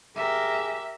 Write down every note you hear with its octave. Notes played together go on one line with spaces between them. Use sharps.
G4 G#4 A#4 E5